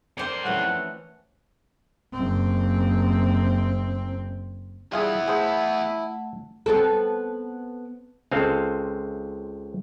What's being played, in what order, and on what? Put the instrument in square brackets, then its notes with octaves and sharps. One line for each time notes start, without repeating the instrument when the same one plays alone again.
[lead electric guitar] F2 C6 [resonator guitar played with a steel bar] A#4 C5 D5
[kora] E3 A3 C#4 [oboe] F#5
[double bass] F#1 C4
[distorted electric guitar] E3 B3 [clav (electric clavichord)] G3 F4 G#4 [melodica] E4
[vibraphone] A3 F#5 [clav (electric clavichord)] G#4 C5
[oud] B3 C4 A4
[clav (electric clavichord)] C#2 G#3 C4 A4 C5 F5